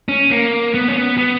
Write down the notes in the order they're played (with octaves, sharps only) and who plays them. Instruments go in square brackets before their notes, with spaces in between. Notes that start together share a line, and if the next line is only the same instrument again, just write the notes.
[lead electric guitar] C#4
A#3
B3
C#4
B3
B3